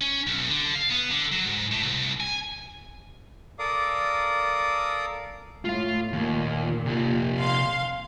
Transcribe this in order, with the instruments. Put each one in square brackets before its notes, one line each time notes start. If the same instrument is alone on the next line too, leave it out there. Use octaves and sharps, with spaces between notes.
[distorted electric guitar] C#4
B1
D3
F5
B3
D3
F#3
G#2
A2
C2
G#5
[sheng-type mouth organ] A4 A#4 D5 F5 D6 D#6
[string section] A2 [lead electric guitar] F4 F5
[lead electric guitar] D#2 [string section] A#2
[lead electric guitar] C3 F4
[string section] F5 C6